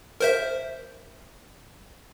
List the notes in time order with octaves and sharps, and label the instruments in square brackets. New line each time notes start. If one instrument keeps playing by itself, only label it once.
[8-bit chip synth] A#4 C5 E5